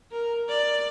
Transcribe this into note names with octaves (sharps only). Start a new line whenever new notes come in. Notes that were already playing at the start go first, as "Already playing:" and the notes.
A#4
D5